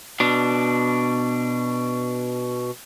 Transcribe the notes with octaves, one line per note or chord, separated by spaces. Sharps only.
B2 D4